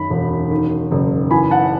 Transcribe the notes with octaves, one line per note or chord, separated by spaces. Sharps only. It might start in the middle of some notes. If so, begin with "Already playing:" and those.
Already playing: F#2 D#3 B5
E1
D#3
F#1
E3 G#5 B5
F#5 A5